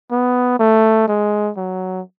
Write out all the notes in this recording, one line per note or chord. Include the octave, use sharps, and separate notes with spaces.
B3
A3
G#3
F#3